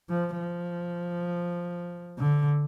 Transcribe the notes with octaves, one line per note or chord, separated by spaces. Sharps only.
F3
F3
D3